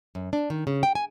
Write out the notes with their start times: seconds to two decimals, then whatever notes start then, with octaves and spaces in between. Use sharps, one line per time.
0.15 F#2
0.33 D4
0.50 D#3
0.67 C#3
0.83 G5
0.95 G#5